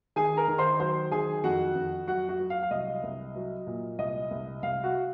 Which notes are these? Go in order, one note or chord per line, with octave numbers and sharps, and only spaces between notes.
D#3 G#4 G#5
A#4 A#5
D#3
C5 C6
F#3 C5 C6
D#3 G#4 G#5
F2 F#4 F#5
F2
F#3 F#4 F#5
F#4 F#5
F#3
F5
F5
C2 D#5
C2
F#3
A#2
C2 D#5
C2
C2 F5
F#4 F#5